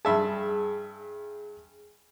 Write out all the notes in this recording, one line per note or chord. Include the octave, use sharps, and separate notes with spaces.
G2 G#4 E5 A5